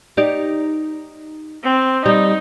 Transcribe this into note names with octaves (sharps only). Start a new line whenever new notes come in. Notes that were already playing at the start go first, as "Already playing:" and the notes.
D#4 G4 D5
C4
G3 D#4